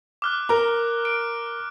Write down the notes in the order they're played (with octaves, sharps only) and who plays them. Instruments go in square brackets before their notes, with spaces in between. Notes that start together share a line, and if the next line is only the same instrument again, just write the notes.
[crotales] D6 F6 F#6
[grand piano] A#4 A#5
[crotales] D7